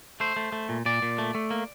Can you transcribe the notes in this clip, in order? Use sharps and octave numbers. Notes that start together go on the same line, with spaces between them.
A3 C5
A3
A3
A#2
A#2 D5
A#2
A3
A3
A#3